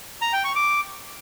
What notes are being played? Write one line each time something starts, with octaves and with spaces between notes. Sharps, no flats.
A#5
G5
C#6
D6